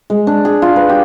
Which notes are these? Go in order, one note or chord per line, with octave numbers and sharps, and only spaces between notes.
G#3
D4
G#4
F4
B4
G4